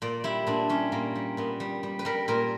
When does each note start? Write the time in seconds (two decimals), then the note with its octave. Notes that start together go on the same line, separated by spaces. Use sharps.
0.02 A#2 D5
0.24 G3 E4
0.47 A#2 D4
0.69 G3 C#4
0.92 A#2 A#3
1.16 G3
1.37 A#2 B3
1.60 G3
1.83 G3
1.99 B4
2.05 G3 A#4
2.28 A#2 A#4